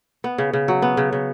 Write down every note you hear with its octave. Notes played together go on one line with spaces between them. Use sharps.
B3
C#3
C#3
F#3
B3
C#3
C#3